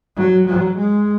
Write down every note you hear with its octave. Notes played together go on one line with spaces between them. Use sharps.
F#3
F#3
G#3